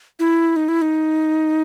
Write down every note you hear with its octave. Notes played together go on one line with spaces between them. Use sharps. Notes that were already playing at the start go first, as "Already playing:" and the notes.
E4
D#4
E4
D#4